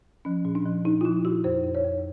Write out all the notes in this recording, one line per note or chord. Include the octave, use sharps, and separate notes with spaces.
F3 C#4
A#2
D4
F3
A#2 D#4
F4
F3 E4
A#2 F#4
F2 C5
F2
C#5
F2